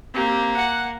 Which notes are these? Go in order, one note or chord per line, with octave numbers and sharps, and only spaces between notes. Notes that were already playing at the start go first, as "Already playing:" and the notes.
A#3 C4 G4
F#5